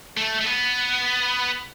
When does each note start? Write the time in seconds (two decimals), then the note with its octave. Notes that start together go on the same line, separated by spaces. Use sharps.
0.17 A3
0.41 A3
0.46 B3